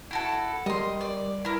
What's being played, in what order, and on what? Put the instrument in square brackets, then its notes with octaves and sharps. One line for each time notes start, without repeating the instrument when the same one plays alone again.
[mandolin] E4 F#4 A4
[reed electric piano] G3 A#4 [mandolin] D#5 C6
[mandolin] D5
E4 A#4